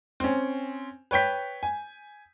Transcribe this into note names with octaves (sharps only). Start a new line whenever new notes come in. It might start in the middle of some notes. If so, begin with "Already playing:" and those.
C4 C#4
B4 C#5 G5 G6 B6
G#5